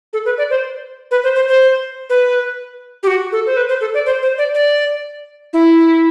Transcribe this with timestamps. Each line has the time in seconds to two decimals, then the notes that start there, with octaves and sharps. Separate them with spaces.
0.13 A4
0.25 B4
0.38 D5
0.50 C5
1.11 B4
1.24 C5
1.35 C5
1.48 C5
2.10 B4
3.03 G4
3.07 F#4
3.32 A4
3.47 C5
3.57 B4
3.69 C5
3.81 A4
3.94 D5
4.06 C5
4.22 C5
4.38 D5
4.55 D5
5.53 E4